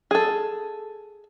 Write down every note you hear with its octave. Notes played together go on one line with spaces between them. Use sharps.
G#4 A4